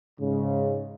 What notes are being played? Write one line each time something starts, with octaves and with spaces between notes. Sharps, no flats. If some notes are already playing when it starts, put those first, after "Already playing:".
G#2 C#3